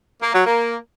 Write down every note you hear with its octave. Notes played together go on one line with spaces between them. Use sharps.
A#3
F#3
A#3